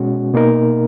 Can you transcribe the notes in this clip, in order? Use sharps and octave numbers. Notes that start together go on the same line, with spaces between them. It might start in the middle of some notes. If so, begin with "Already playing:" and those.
Already playing: B2 G#3 C#4 F#4
B2 A#3 D#4 A#4